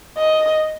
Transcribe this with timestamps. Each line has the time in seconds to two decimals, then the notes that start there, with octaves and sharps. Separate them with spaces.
0.18 D#5